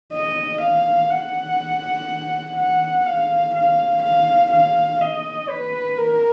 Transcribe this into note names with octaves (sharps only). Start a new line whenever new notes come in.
D#5
F5
F#5
F#5
F5
F5
F5
F5
D#5
B4
A#4